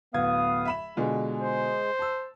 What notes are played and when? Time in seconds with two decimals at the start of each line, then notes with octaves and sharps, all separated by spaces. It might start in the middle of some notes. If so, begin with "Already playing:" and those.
0.14 D1 B3 F5 D#6 G#6
0.65 E5 B5 E7
0.97 B2 D3 G#3 F4
1.41 C5
1.99 A5 E6